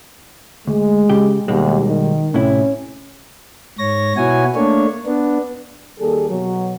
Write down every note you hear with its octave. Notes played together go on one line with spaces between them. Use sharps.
D2 G#3
C#3 G4
D#2 B2 G3 G#3
D#3
A2 C3 C#4 E4
G#2 C#5 A#6
B2 E4 F#4 C#5 G#5
A3 A#3 D4 C#5
B3 D4
D#2 G3 A#3 G#4 A4
B2 F#3